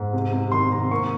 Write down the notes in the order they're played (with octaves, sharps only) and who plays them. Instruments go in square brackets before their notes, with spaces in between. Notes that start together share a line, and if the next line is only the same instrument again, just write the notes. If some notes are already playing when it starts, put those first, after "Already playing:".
Already playing: [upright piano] G#2
C3
C3
D#3 C6
C3 A#5
A#3 C#6